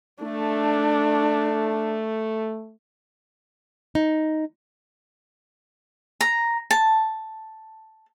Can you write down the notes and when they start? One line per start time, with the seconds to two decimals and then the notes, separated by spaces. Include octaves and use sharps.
0.22 A3 D4
3.95 D#4
6.21 A#5
6.71 A5